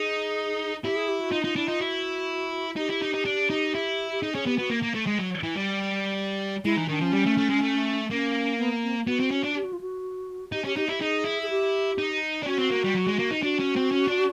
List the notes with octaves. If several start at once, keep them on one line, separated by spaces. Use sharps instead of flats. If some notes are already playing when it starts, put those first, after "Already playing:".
Already playing: D#4 G#4
E4 G4
G#4
G4
F#4
D#4 F4
D#4 F4
D4 E4
D#4 F4
E4 F#4
D#4 G4
E4
D#4
D#4
D4
D#4
E4
G4
D#4 G#4
C#4 G#4
B3 G4
B3 F#4
A#3
A#3
A3
G#3
F#3
E3
G3
G#3 E4
E3 D#4
D#3 D4
F3 C#4
G3
A3
A3
G#3
A3
A#3 C#4
B3
C4
B3 F#4
C4
C#4
D4
G4
F#4
F4
F#4
D#4 G4
C#4 G4
D#4 G4
E4 G4
D#4 G#4
E4
G#4
G4
D#4
D4
C#4 F#4
C4
A#3
G3
F#3
G#3
A#3
D#4
D4 F#4
C#4
C4
C#4
D4